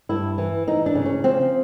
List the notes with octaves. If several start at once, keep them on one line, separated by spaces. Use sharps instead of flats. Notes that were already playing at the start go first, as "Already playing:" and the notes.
G2 E4
E3
E3 D#4
D4
C#3
C#4
F3 C4